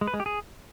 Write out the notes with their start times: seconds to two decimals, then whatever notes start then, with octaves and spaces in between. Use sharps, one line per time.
0.01 G#3
0.07 B4
0.14 G#3
0.20 G4
0.26 G#4